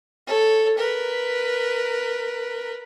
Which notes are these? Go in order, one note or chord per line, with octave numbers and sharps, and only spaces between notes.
A4 C#5
A#4 B4